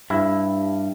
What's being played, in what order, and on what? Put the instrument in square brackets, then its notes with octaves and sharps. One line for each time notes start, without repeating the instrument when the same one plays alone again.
[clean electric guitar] G2 [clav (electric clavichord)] E4